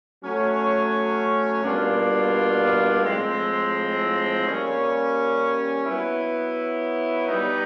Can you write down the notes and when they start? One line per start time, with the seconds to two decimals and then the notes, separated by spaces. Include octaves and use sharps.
0.22 F#3 A3 C#4
1.63 B2 G3 A#3 D4 F4
3.04 A2 F3 G#3 C4
4.45 G3 A#3 C#4
5.85 F#3 B3 E4
7.27 G3 B3 D#4